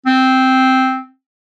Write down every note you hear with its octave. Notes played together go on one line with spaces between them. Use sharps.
C4